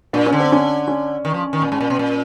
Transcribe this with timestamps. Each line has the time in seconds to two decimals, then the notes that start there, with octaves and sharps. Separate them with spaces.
0.13 A#2 D4
0.26 C#4
0.32 D3
0.40 C4
0.52 C#4
0.88 C#4
1.25 D#3
1.34 F3
1.53 D#3
1.62 A#2
1.72 G#2
1.81 A#2
1.90 B2
1.99 A#2